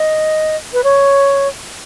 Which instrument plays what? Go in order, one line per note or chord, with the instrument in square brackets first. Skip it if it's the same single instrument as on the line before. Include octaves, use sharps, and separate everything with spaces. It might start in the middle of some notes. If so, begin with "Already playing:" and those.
Already playing: [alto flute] D#5
B4
C#5